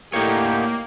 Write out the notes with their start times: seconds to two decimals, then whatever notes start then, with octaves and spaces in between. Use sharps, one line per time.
0.13 A2 D3 A#3 D#4 G4 C#5